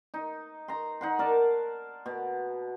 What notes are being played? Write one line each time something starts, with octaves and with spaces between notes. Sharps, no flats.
D#4
A#5 C6
D#4 F#5 C6
A#4 D5 A5
B2